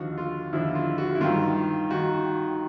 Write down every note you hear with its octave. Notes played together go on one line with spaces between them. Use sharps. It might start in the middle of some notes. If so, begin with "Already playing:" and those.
Already playing: D#2 D3 F3 F#4
F4
D#2 D3 F3 E4
F4
F#4
E4
G2 D#3 F4
D#3 F#4